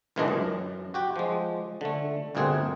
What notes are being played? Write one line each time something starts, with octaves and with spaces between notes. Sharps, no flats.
C#2 A#2 E3 G#3 D4 D#5
F#2
F#4 G4 G5
F3 G#3
D3 A3
G1 D2 A#2 C4 G#4 F#5